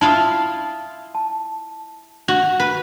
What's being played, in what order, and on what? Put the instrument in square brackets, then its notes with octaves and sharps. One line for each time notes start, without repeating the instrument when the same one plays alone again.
[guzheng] E4 F4 F5 [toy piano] A5 D#6
[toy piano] A5
[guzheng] F#4
B4